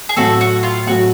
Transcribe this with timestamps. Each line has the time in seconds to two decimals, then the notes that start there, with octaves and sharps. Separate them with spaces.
0.09 G#4
0.16 A2 F#3 A3 F#4 A4
0.41 F#4
0.63 F4
0.86 A2 F#3 A3 F#4